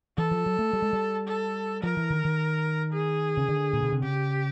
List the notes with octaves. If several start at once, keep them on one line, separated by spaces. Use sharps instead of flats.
E3 A4
F3
F#3
A3
G3
G#3
G3
A4
F3 A#4
E3
D#3
D#3
G#4
C#3
D3
A#2
B2
C3
C#3 G4